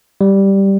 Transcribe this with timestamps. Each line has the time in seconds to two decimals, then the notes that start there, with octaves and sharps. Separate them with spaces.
0.21 G3